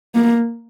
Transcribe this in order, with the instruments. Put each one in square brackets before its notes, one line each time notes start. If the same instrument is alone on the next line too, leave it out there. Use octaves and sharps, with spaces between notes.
[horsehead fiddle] A#3